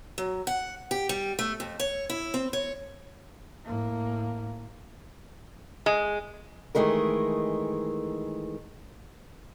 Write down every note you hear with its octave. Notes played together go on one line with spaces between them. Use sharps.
F#3
F#5
G4
G3
A3
F2
C#5
E4
C4
C#5
A2 A#3
G#3
D#3 E3 G#3 A3 A#4